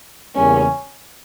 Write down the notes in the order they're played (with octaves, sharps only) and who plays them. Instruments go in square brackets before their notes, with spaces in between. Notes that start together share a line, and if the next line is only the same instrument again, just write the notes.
[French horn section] E2 C#3 E3 G3 A#3 [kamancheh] C#4